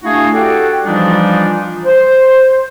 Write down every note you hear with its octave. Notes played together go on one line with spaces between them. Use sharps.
A3 D4 E4 F#4 G#4 F5
F#4 G4 A4 D5 F#5 G5
E3 F3 G3 D4 D#4 F4
C5